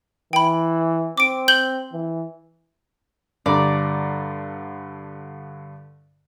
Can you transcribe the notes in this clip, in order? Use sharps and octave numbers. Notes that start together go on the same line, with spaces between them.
E3 G5 B5
C4 D6 D7
G6 F#7 G7
E3
G2 D3 D5 A#5